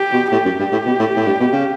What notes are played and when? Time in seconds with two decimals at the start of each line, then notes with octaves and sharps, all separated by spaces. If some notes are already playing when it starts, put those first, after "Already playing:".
Already playing: G4
0.12 B2
0.32 A2 G4
0.45 F#2
0.59 G2
0.72 A2
0.86 B2
0.99 A2
1.16 A2
1.26 G2
1.40 B2
1.53 C#3